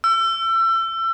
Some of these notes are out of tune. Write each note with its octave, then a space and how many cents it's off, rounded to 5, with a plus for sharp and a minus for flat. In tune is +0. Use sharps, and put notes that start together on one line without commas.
E6 +30